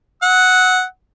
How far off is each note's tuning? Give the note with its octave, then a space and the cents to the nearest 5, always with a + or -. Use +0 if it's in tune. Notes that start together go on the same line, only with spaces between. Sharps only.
F#5 +0 E6 -45